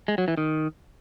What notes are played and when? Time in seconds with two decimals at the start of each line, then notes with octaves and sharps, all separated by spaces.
0.08 G#3
0.18 F#3
0.28 E3
0.37 D#3